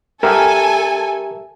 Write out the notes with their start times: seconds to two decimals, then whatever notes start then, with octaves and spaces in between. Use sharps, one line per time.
0.23 G4 A4 A#4 E5 G#5